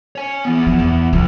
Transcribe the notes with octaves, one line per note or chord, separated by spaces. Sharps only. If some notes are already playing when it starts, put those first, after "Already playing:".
C#5 G#5
E3 B3
F3
E2
C2 C#3 F3